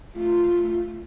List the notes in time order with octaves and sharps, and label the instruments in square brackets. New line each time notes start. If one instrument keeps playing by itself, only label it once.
[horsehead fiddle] A3 F4